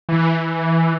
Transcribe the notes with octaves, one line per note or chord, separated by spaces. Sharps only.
E3